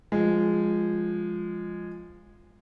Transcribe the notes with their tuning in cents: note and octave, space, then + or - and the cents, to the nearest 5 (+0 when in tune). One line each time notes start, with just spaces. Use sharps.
F3 +0 G#3 -10